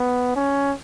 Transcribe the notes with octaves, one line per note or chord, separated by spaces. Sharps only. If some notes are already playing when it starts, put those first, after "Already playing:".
Already playing: B3
C#4